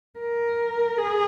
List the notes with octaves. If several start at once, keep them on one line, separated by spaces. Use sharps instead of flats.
A#4
G#4